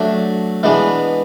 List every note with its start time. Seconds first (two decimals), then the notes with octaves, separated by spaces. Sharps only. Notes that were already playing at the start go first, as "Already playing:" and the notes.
Already playing: F#3 A3 D4
0.63 E3 G#3 B3 D4